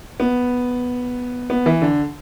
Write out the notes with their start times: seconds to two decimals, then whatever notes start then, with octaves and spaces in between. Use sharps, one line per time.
0.20 B3
1.50 B3
1.66 E3
1.82 D3